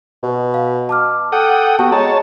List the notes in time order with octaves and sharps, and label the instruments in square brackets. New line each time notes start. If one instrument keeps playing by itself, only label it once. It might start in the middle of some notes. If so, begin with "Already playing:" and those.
[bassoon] B2
[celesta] F5
A5 D6 F6
[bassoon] A4 [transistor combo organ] F#5 G5 D#6
[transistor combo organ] B3 G4 [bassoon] F#4 [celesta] G5 A5
[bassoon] G#3 [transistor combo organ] C#5 A5 [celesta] A#5